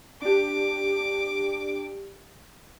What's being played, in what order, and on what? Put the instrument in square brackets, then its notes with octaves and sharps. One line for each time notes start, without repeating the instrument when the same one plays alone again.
[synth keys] D4 G4 [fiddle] D6